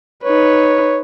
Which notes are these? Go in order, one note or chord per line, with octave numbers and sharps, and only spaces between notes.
D#4 B4 C#5